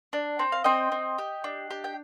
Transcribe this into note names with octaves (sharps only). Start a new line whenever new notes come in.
D4
C4 G5
F5
C4 D#5 G5
C4
G4
D4
G4
G5